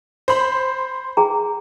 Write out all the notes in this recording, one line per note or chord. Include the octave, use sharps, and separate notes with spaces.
C5 B5
G#4 G5 A#5